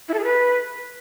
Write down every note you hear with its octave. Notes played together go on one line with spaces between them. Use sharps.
E4
A4
G#4
B4